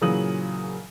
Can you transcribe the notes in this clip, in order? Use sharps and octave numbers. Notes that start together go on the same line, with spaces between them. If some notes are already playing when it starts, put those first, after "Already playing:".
A#2 C#3 E3 F#3 D#6 F#7